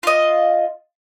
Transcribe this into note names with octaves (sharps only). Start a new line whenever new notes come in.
F4 D#5